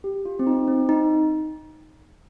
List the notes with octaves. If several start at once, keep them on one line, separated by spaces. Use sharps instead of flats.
G4
F4
C4
D#4
C4
D#4